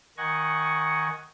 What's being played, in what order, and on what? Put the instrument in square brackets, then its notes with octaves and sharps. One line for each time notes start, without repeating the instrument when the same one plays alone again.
[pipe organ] D#3 D#5 F#5 G#5 C#6